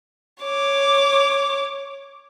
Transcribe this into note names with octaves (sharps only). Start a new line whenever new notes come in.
C#5 D6